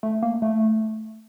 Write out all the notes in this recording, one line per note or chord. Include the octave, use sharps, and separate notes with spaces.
A3
A#3
A3